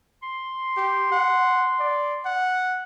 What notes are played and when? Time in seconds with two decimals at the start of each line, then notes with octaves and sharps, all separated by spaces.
0.23 C6
0.77 G4
1.11 F#5
1.80 D5
2.25 F#5